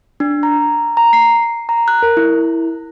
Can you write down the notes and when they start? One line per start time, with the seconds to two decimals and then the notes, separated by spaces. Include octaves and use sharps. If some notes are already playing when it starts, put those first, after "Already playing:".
0.20 D4
0.43 A#5
0.97 A#5
1.13 C7
1.69 A#5
1.88 F#6
2.02 A#4
2.17 E4